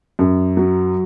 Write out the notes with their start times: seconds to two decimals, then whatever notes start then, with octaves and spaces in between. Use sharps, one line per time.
0.19 F#2
0.57 F#3